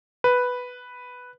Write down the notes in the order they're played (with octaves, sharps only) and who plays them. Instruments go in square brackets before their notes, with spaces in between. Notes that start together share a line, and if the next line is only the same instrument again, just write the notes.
[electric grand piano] B4